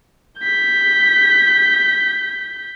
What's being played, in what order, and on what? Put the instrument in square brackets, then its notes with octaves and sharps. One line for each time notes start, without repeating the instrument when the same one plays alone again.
[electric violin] G6 B6